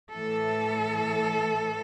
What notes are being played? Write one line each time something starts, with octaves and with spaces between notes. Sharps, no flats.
A2 E3 A4